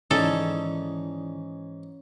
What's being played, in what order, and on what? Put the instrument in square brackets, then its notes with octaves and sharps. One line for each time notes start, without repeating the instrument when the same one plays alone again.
[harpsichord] G#2 E3 D#4 [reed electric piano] D#3 E4 D5 [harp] C#4 [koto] A4